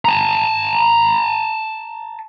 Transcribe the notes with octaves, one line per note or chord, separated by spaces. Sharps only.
A5 A#5